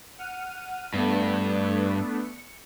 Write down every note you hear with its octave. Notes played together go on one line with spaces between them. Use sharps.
F#5 F6 D#7
G2 A3 B3 D4
C#7